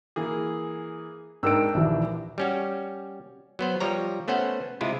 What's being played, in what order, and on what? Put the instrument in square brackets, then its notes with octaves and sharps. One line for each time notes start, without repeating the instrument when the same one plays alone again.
[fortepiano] E3 A#3 G#4
[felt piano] G#2 A#4 D7 [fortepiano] D4 G5 E6
[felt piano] A#1 D#2 E3
[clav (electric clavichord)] G3 C#4 F#4
F#3 B3 C5
F3 G3 C#5 A#5
A3 B3 C#4 C5 F#5
C3 G#3 E4 F4